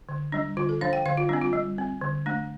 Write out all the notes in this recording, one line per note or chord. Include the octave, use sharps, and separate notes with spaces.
D3
G3 D4
D3 F4
A4
F3 D4 F5
G5
D3 F5
F4
G3 C4 D4
F4
G3
C4
D3
A3 D4